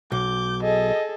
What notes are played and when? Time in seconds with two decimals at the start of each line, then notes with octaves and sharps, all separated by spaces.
0.12 B1 D6 G6
0.63 G#4 A4 D#5